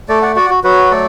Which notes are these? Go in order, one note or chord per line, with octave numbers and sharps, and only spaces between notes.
A3 A4 D5
D5 F#5
F#4 D5 F#5
F#4
F#3 F#4 B4
A3 A4 D5